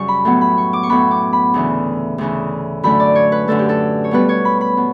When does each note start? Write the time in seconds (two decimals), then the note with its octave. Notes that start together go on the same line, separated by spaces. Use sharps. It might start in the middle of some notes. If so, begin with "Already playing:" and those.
Already playing: F#2 C#3 G3 C#6
0.08 B5
0.25 A2 F#3 B3
0.41 B5
0.58 C#6
0.73 D6
0.83 C#6
0.90 A2 F#3 B3 B5
1.11 D6
1.33 B5
1.54 D2 C#3 E3
2.18 D2 C#3 E3
2.83 F#2 D3 A3 B5
3.00 D5
3.15 C#5
3.32 B4
3.48 F#2 D3 A3 A4
3.59 G4
3.69 A4
4.04 C#5
4.11 B2 G3 B3 B4
4.29 C#5
4.45 B5
4.61 B5
4.77 B2